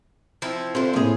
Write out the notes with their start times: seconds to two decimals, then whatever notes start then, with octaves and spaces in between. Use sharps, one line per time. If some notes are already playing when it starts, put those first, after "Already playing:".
0.42 F3 C4 E4
0.75 D3 C4 E4 F4 C5
0.94 A2 C3 A#3 F4 G#4